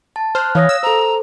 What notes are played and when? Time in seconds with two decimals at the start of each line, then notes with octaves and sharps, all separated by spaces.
0.16 A5
0.35 C5 F6 F#6
0.55 E3 C#5 F5 D#6 A#6
0.69 E6
0.83 A4 C5 A#5